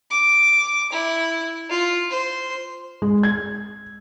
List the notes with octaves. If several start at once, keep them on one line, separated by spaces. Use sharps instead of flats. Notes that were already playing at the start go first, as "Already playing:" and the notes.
D6
E4
F4
C5
G#3
G#6